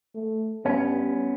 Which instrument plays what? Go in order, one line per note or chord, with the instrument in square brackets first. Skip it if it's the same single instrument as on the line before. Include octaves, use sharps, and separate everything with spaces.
[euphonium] A3
[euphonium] G2 [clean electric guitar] B3 C#4